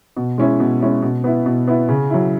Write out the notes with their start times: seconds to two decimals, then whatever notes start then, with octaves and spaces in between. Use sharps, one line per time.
0.16 B2
0.38 G#3 C#4 E4
0.60 B2
0.81 G#3 C#4 E4
1.02 B2
1.24 B3 E4
1.46 B2
1.68 B3 E4
1.89 C#3
2.10 F#3 E4